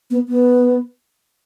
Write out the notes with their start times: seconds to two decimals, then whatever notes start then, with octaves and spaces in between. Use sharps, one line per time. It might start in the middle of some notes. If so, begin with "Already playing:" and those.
0.11 B3
0.29 B3